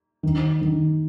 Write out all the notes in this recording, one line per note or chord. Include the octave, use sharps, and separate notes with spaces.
D#3
D#3